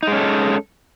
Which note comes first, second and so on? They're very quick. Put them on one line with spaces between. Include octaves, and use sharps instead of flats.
D#4 G#3 C#4 A4